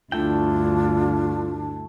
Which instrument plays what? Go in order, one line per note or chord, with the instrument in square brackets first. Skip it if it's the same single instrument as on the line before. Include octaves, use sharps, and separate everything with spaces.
[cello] D2 G2 [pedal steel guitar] A3 E4 G5 [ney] D4 [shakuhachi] F4